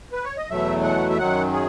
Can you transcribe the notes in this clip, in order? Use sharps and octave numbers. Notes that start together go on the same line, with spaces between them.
B4
C#5
D#5
E2 B2 F#3 A3 E5
F#5
E5
F#2 D#3 F#3 F#5
G#4